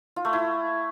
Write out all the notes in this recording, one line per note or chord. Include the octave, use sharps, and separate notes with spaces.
F4
A3
E4